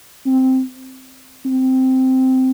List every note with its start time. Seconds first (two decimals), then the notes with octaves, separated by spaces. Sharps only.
0.26 C4
1.45 C4